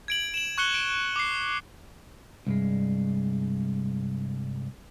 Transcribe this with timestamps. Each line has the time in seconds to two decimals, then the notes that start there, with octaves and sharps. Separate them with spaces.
0.08 G#6 D7 F#7
0.34 E7 F#7
0.58 C#6 F#6 C#7 G7
0.74 D7
1.16 D6 C7
2.47 C2 G2 G#3